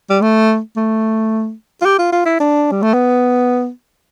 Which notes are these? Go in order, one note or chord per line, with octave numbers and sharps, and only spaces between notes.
G3
A3
A3
F4
G4
F4
F4
E4
D4
G3
A3
B3